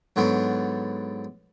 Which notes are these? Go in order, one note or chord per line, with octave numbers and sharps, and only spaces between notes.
G#2 D3 F#3 B3